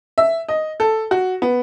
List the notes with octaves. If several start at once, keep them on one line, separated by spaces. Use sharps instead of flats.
E5
D#5
A4
F#4
B3